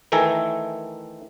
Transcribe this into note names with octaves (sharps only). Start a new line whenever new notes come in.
D#3 E3 A3 A4 G#5 A#5